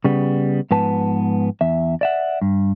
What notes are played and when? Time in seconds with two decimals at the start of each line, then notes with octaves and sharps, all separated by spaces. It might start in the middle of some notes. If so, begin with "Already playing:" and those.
0.04 C#3 G3 B3
0.71 G#2 F3 B3 B4 A5
1.61 E2 E5
2.01 D5 E5 F#5
2.42 G2